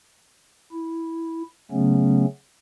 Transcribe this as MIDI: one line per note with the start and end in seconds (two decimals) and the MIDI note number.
0.72 1.43 64
1.71 2.25 49
1.71 2.25 54
1.71 2.25 57
1.71 2.25 59
1.71 2.25 61